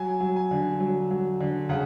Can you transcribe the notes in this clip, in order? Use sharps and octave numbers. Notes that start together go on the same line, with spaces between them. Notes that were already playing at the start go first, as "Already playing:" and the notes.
Already playing: F#3 G#5
F#3
G#5
D3
F#3
F#3
D3
C#3 F#5